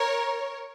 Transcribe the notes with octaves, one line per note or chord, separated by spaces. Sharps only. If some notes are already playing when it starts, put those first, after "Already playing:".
Already playing: A#4 C#5